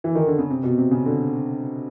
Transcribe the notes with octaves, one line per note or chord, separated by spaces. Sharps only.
E3
D#3
D3
C#3
C3
B2
C3
C#3
D3